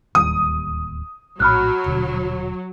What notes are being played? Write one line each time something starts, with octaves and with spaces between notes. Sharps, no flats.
D1 D#2 G3 D#6
A#1 A2 F#3 B5 F6 F#6
D#1 B2 D3